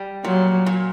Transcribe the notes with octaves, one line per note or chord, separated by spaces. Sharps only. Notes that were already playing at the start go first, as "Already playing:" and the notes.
Already playing: G3
A#2 F#3
A#2